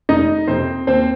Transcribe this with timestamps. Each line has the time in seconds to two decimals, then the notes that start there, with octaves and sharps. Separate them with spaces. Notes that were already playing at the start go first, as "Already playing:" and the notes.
0.09 F1 D#4 D#5
0.47 F2 C3 C4 C5
0.87 D#2 C4 C5